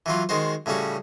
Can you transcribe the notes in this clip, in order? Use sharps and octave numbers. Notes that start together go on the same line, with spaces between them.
E3 F#3 F4
D#3 G#3 F#4 C5
A2 C#3 G3 C#4 F#4